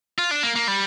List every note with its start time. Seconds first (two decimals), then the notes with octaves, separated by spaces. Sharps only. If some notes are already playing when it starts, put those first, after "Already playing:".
0.18 F4
0.31 D4
0.43 A#3
0.56 A#3
0.68 G3